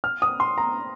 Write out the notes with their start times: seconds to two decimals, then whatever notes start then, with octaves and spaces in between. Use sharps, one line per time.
0.04 F6
0.22 D#6
0.40 C6
0.58 A#5